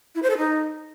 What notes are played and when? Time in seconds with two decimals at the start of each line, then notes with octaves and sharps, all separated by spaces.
0.15 E4
0.23 C5
0.30 A4
0.38 D#4